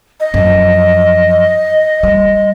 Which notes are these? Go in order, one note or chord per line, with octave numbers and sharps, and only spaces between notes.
D#5
F#2 F3
G3